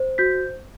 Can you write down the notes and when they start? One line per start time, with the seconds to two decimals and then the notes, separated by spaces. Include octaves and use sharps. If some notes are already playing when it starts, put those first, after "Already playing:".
Already playing: C5
0.18 F#4 G6 B6